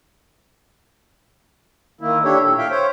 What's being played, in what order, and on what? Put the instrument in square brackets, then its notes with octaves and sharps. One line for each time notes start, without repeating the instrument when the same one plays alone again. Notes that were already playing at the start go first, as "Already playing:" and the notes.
[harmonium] D#3 A#3 E4
D4 E4 G4 A4 C#5
A#2 A4
E5 F5 G5
C5 C#5